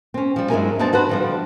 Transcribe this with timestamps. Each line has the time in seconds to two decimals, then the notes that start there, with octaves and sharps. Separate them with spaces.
0.14 C4 C#4
0.36 F3 G3
0.50 G2 F#3 G#3 E4 A#4 G#5
0.79 G2 B3 C4 D4 C5 A5
0.93 F#4 B4 C5 F#5
1.09 D3 F3 G3